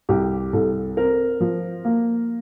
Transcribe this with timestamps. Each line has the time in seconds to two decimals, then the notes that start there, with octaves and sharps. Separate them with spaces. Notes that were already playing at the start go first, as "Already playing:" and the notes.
0.09 C2 G4
0.53 C2 A4
0.97 C4 A#4
1.40 F3
1.85 A#3